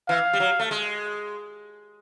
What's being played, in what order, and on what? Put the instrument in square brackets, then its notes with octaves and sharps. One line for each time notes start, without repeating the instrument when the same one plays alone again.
[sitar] E3 [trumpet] F5
[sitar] G3
F#3
A3
G#3